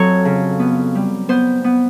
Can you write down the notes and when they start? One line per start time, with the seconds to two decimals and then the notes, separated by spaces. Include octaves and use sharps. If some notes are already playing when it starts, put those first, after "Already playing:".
Already playing: F2 F#3 A4 C#5
0.25 C#3
0.59 B3
0.95 G3
1.29 B3 C5
1.64 B3